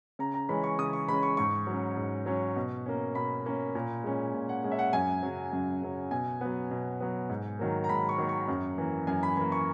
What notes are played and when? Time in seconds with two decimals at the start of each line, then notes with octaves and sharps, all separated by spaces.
0.19 C#3 A#5
0.34 A#5
0.49 E3 G#3 C#4 B5
0.64 C#6
0.78 C#3 D#6
0.93 C#6
1.08 E3 G#3 C#4 B5
1.23 C#6
1.37 G#2 C#6
1.67 F#3 C#4
1.97 G#2
2.26 F#3 C#4
2.56 B2
2.86 A#3 C#4
3.15 B2 B5
3.46 A#3 C#4
3.75 A#2
4.04 G#3 C#4
4.34 A#2
4.49 F#5
4.64 G#3 C#4
4.72 E5
4.79 F#5
4.93 F#2 G#5
5.23 C#3 F#3
5.53 F#2
5.82 C#3 F#3
6.11 B2 G#5
6.41 F#3 B3
6.71 B2
7.00 F#3 B3
7.29 G#2
7.59 D#3 F#3 A#3
7.84 A#5
7.89 G#2 B5
8.09 C#6
8.18 D#3 F#3 A#3
8.29 C#6
8.48 F#2
8.78 E3 A#3
9.07 F#2 G#5
9.23 B5
9.37 E3 A#3 B5
9.52 C#6